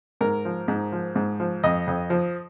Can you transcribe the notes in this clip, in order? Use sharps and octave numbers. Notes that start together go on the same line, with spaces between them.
G#2 A#4
F3
G#2
F3
G#2
F3
F2 D#5
F2
F3